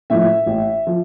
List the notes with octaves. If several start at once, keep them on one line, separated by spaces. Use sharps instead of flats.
A2 F3 E5
A1
F3